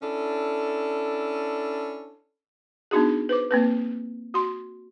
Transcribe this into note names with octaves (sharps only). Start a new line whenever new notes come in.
C#4 D4 E4 A4
B3 D4 D#4 F#4 G#4
B4 C5 D6
A#3 C4 B4
F#4 C6